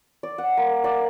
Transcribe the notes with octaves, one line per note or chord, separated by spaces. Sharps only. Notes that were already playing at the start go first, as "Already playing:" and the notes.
D5
F#5
A#3
D5